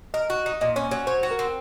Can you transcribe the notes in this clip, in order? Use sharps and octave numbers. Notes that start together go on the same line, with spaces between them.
A#4 D#5
F#4
D#4
A#2 D#5
C#4 C#5
F#3 C#5
C5 C#5
F#4
A#4
C4